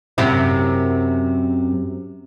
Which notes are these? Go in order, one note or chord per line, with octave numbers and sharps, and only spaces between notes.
F#2 C3 E4